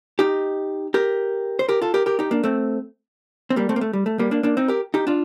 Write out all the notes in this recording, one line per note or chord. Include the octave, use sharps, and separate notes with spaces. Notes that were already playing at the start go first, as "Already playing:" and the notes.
D#4 G4
G4 A#4
C5
G4 A#4
F4 A4
G4 A#4
G4 A#4
D#4 G4
A#3 D4
A3 C4
C4
G3 A#3
A3 C4
A#3
A3
G3
A3
G3 A#3
A#3 D4
A#3 D4
C4 D#4
G4 A#4
D#4 G4
D4 F4